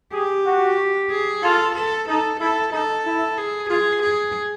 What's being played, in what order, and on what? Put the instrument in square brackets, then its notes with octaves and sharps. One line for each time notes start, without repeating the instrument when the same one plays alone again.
[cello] G4 [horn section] G#4
[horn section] F#4
[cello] G#4
[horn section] F4 [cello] A4
[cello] A4
[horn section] D#4 [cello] A4
[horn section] E4 [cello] A4
[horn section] D#4 [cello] A4
[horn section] E4
[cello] G#4
[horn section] F4 [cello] G#4
[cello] G#4